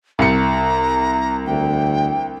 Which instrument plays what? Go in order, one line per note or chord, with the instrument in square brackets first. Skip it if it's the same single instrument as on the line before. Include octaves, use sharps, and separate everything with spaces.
[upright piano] C2 C#7 [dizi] A#5
[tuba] D2 [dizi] G5